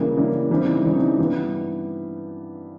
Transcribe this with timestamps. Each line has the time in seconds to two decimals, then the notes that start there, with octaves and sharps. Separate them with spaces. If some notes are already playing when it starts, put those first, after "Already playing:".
Already playing: C#3 E3 G3 A#3
0.16 C#3 E3 G3 A#3
0.49 C#3 E3 G3 C4 D#4
0.84 C#3 E3 G3 C4 D#4
1.18 G2 E3 G3 B3